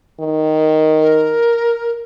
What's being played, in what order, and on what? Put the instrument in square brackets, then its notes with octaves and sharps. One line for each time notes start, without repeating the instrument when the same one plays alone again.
[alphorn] D#3
[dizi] A#4